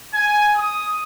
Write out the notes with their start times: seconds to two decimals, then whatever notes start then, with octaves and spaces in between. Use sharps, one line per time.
0.13 G#5
0.55 D#6